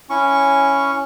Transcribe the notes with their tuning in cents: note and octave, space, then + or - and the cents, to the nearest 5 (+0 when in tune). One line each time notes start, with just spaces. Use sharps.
C#4 +0 E4 +0 C#6 +0